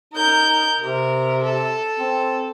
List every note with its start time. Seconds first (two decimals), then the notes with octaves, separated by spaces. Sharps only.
0.14 D#4 A#4 G6
0.80 C3 A#4
1.43 A4
2.00 C4